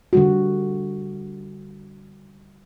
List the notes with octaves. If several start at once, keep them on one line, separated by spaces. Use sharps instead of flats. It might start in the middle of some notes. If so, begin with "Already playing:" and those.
D3 G3 F#4